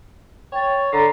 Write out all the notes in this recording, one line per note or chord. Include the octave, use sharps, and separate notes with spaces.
C#5 G5 A6
D3 A#5 B5 C7